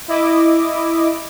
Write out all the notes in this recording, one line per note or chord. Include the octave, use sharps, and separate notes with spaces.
E4 D#5 D6